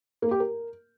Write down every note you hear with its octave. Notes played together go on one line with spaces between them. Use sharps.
A#3
G4
A#4